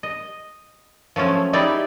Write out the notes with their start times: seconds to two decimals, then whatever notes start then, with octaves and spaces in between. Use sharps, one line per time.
0.03 D#5
1.16 F3 F#3 A3 C#4
1.53 D#4 E4 G4 G#4 D5